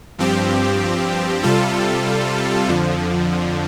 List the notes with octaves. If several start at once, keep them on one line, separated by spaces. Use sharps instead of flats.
G2 F3 C4 G4
C3 G3 F4 A4
F2 D3 F3